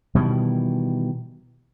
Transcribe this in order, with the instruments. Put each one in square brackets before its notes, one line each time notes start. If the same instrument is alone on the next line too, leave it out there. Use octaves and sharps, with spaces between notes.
[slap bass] B2 D#3 E3 G3